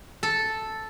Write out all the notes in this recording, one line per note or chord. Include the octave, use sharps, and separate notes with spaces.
A4